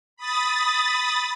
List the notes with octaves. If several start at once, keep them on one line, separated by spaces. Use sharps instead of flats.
B5 D#6 A6